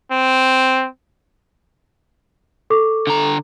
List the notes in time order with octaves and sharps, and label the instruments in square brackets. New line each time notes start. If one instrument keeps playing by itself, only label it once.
[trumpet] C4
[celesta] A4 C#6 D6
[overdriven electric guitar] D3 A#5